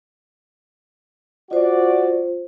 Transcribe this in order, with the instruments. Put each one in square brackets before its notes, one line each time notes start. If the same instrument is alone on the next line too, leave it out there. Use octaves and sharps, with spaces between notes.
[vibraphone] F4 C5 [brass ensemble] F#4 D5